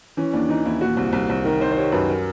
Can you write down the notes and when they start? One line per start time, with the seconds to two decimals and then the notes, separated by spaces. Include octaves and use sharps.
0.17 E3 C#4
0.33 D#2 D4
0.49 E3 D#4
0.65 D#2 E4
0.81 A#2 F#4
0.97 C2
1.13 C2
1.29 C2
1.44 D#3 A#4
1.60 D#3 C5
1.72 C5
1.76 G3 C#5
1.92 F#2 B4
2.09 A#4